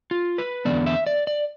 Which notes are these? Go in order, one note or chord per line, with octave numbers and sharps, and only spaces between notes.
F4
B4
E2 D3 F3 B3 D5
E5
D5
D5